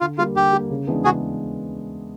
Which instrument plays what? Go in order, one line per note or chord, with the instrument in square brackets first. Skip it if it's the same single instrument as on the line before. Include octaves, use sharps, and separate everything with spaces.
[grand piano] D3 [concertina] F4
[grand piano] G3 A#3 [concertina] F4
[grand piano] D3 [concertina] G4
[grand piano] G3 A#3
C#3
E3 G#3 B3 D4
[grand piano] C#3 [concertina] F#4 G#4